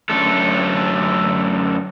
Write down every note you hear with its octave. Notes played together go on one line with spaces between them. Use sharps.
F#2 D3 A3 A4